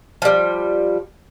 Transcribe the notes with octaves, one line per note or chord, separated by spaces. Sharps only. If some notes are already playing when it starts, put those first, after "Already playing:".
F3 G3